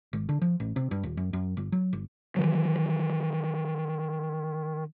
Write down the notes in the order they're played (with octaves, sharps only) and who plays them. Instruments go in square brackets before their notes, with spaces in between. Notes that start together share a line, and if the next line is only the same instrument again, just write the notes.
[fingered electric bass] G#1
D3
F3
A1
C3
G2
D#1
F#2
F#2
G1
F#3
G1
D#3 E3 F#3